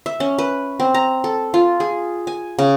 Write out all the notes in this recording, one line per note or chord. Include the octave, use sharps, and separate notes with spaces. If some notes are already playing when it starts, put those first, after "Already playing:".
E5
C#4
B4
C4
A#5
A4
F4
G#4
G#5
C#3